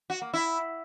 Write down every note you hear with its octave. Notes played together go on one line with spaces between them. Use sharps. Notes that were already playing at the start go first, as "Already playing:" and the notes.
F#4
A#3
E4